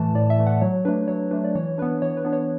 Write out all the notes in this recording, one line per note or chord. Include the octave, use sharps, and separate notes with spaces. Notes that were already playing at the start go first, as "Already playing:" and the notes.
Already playing: A2 E3 A3 A5
A2 D5
E5
E3 A3
F#5
F#3 C#5
A3 D4 B4
F#3 C#5
A3 D4 B4
D5
E3 C#5
B3 D4 B4
E3 C#5
B4
B3 D4
C#5